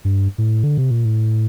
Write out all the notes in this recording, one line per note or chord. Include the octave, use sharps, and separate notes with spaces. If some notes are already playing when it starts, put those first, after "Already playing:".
G2
A2
D3
C3
A#2
A2